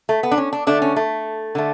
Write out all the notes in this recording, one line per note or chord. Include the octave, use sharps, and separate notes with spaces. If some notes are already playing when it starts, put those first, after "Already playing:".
A3
B3
D4
C#4
D4
D3 A3 D4
C#4
A3
D3 A3